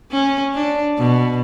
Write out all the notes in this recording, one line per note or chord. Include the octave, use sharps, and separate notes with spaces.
C#4
D4
B2